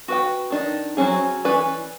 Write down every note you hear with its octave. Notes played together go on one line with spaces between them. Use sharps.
F#4 B4 G5
D#3 D4 D#4
F#3 G3 C4 C#4 G#4
E3 C#4 B4 D5